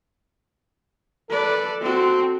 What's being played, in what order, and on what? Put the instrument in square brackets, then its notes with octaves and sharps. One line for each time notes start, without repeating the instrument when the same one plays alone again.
[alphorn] A4 [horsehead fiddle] B4 D5
[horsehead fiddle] C4 F#4